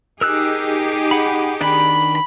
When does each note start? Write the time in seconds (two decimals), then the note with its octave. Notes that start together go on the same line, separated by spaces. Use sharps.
0.21 D#4 G4 G#4 A#4 E6 F#6
1.11 F#5 B5
1.61 D#3 D4 B5